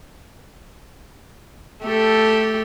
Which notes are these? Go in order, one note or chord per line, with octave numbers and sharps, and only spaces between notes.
A3 G4 A4